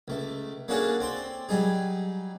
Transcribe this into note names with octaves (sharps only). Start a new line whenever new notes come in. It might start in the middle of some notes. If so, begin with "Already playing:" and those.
C#2 A3
A#3 C#4 D4 F#4 G#4 A4
C4 D5 C6
F#3 G3 D#4 G#4